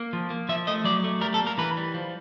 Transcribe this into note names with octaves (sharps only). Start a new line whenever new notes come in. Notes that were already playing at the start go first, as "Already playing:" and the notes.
Already playing: A#3
F3
A#3
F3 E5
A3 D#5
F#3 D5
A3
G3 A#4
A4
A#3
A#4
E3 B4
G3
F3